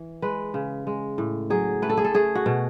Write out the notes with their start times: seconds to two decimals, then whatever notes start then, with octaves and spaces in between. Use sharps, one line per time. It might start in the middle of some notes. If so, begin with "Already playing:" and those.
Already playing: E3
0.22 G#3 B4
0.54 C#3
0.87 G#3
1.18 A2
1.50 F#3 G#4
1.82 A3 B4
1.90 A4
1.97 G#4
2.05 A4
2.14 A3 G#4
2.35 F#4
2.46 B2